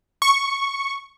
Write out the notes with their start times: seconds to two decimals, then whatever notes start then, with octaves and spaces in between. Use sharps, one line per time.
0.22 C#6